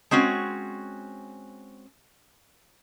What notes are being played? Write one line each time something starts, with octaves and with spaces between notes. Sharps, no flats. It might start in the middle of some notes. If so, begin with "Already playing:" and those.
G#3 C4 C#4 F#4